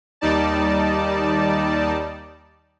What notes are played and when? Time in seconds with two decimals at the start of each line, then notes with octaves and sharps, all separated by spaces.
0.21 D#2 G3 D#4 D5 A5